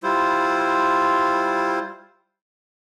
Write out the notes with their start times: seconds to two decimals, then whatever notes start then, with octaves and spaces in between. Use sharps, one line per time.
0.03 G3 E4 F4 C5